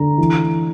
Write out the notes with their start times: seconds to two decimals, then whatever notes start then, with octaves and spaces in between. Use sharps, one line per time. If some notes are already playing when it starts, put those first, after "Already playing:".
Already playing: D3 A#5
0.18 E3